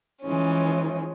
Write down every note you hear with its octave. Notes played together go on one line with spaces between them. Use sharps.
E3 F3 G#3 C#4